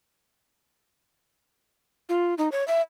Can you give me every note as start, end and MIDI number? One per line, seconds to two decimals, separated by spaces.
2.09 2.34 65
2.38 2.49 63
2.52 2.66 73
2.68 2.81 76